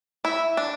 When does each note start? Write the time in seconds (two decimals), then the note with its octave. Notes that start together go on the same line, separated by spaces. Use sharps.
0.25 E4 E5
0.57 D4